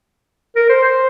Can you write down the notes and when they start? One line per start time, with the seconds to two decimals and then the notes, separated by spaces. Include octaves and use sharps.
0.56 A#4
0.69 C5
0.84 C5